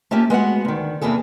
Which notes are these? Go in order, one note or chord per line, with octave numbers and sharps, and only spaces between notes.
A3 A#3 C#4 F4 G4
G#3 B3 F#4 F#5
D2 D#3
E2 C3 E3 A#3 G#4 A4